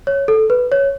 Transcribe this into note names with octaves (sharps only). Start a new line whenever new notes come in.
C#5
A4
B4
C#5